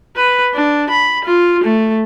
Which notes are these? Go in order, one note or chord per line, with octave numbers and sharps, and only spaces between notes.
B4
D4
B5
F4
A3